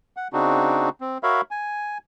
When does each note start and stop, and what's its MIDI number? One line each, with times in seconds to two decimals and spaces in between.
0.17 0.28 78
0.33 0.89 49
0.33 0.89 60
0.33 0.89 62
0.33 0.89 63
0.33 0.89 66
1.01 1.18 60
1.23 1.41 66
1.23 1.41 70
1.23 1.41 73
1.23 1.41 76
1.23 1.41 77
1.23 1.41 83
1.51 1.98 80